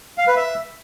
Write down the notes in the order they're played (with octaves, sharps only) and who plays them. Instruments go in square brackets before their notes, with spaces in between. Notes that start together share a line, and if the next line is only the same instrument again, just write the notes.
[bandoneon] F5
B4
E5